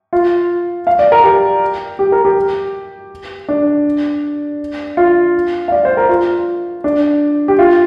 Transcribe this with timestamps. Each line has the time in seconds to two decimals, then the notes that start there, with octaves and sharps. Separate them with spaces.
0.13 F4
0.87 F5
0.99 D5
1.12 A#4
1.24 G4
1.99 G4
2.12 A#4
2.25 G4
3.49 D4
4.97 F4
5.68 F5
5.72 D5
5.85 C5
5.97 A#4
6.09 F4
6.84 D4
7.48 G4
7.59 F4